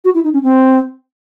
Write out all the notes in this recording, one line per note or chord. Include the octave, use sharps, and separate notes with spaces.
F#4
E4
D#4
C#4
C4